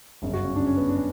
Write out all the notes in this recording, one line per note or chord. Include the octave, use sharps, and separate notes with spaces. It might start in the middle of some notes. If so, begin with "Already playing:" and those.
G1 F#2 C#3
F#4
C#4
G1 F#2 C#3 D4
C#4
B3
D4
C#3 C#4